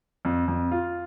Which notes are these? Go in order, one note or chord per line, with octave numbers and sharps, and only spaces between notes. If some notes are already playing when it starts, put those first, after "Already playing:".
F2
F2
F4